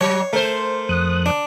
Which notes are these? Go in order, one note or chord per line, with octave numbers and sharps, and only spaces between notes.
F#3 C#5
A3 A#4 C5
F2 D#6 F#6
D4